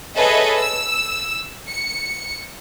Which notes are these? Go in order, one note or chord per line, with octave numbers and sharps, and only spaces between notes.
G#4 A4 B4 C#5 D#5 E5
E6
C#7